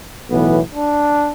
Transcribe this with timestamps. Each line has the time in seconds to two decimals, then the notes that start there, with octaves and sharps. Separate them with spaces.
0.30 B1 A2 E3 B3
0.74 D4